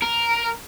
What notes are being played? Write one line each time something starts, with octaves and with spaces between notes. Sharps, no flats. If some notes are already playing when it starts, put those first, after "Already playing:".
A#4